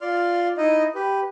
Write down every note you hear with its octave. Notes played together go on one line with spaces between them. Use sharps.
F4 D5 C6 F6
D#4 E4 D#5
G4 B4